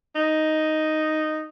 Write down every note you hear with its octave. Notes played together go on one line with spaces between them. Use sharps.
D#4